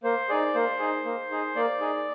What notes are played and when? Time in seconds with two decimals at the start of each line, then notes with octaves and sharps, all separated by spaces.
0.04 A#3 C5
0.29 D#4 G#4 D5
0.54 A#3 C5
0.79 D#4 G#4
1.05 A#3
1.31 D#4 G#4
1.56 A#3 D5
1.81 D#4 G#4